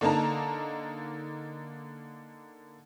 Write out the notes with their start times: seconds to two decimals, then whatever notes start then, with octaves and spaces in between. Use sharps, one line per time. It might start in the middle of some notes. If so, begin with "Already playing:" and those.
0.01 D3 A#3 D#4 A5 A#5